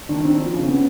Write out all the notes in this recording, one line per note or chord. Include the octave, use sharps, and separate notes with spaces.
D#3 D4
C4 D#4
D4
F3
C#3
C4
B3 C#4